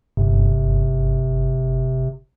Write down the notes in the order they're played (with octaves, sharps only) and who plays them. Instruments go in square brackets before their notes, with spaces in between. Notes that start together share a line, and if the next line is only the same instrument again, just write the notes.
[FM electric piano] G1 [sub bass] C3